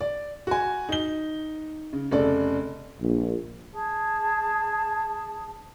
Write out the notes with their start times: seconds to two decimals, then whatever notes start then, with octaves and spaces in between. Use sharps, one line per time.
0.01 D5
0.47 F#4 G#5
0.89 D#4 G7
1.93 C#3
2.11 F1 C#3 A4 D5
3.00 A#1
3.72 G#4 A5